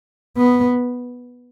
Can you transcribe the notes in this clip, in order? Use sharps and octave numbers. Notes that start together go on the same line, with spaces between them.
B3